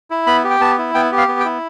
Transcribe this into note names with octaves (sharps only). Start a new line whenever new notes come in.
E4
B3 B5
G4
G5
B3 A5
E4
B3 G5
G4
F5
B3
G5
E4